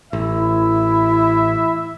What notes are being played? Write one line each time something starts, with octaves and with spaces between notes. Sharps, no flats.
A1 E4 E5